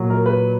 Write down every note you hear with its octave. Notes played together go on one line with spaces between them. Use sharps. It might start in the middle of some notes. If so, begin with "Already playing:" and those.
Already playing: A#2 F#3
A#4
B4